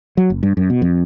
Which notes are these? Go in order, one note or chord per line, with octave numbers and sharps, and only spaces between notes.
F#3
F#1
G2
F#2
B2
F2